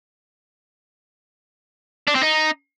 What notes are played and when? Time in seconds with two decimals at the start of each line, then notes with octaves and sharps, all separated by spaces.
2.08 D4
2.15 C4
2.23 D#4